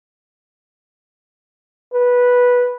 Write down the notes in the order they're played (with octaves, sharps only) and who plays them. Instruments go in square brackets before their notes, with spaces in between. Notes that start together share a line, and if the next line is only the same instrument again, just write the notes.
[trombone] B4